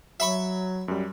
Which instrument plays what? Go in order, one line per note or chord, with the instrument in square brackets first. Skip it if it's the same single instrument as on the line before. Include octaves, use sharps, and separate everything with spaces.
[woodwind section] F#3 [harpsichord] E5 B5 C#6
[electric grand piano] F#2 G3